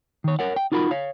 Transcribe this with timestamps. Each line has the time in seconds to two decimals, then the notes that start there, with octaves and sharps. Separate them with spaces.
0.24 D#3 C#5
0.39 A#4 C#5 F#5
0.56 G5
0.72 D#4 F4 F#4 A#4 B5
0.91 C#5 F5